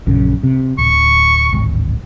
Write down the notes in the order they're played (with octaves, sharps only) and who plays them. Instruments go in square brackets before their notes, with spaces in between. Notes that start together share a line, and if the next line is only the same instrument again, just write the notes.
[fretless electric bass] A#1 F#2 C#3
C3
[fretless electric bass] D1 [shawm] C#6
[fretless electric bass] D1 G#1